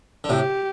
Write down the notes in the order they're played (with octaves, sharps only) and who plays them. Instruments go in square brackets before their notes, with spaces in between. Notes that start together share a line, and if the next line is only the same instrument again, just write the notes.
[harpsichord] D3
[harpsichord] A2 C3 [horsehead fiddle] G4